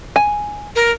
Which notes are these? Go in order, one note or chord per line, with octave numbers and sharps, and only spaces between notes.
G#5
A#4